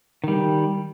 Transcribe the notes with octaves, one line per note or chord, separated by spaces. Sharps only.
D#3 G3